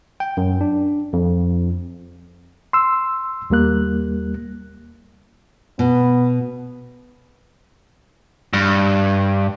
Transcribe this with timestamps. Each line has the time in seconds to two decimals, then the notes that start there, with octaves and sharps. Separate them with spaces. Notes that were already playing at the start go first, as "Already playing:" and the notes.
0.20 G5
0.37 F#2
0.61 D4
1.13 F2
2.73 C6 E6
3.50 D#2 G3 A#3 F#6
5.79 B2 B3
8.53 G2